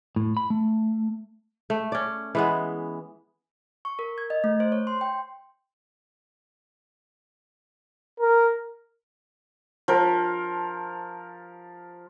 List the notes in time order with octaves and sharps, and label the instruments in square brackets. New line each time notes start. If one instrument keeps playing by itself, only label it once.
[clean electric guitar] A2
B5
A3
[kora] A3
C#4 D5
E3 G#3 B3
[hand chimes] C#6
A#4
G#6
D#5
A3
C5
C#5
C6
G5
[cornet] A#4
[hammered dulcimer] F3 A#4